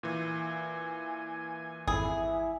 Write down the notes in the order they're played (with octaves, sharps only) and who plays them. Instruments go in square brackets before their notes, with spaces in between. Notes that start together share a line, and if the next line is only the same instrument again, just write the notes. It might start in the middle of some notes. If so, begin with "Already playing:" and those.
[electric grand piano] A#2 E3 [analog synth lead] G#5
[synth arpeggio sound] G#1 F2 [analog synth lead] E4 [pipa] G#4